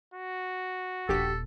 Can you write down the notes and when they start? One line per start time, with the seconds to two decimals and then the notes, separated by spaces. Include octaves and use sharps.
0.14 F#4
1.09 D#1 A#1 A#2 G4 A4 B6